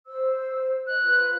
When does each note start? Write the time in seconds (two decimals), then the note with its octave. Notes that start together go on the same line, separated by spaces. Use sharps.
0.07 C5 E6
0.87 D#5 F#6
1.01 F4 B4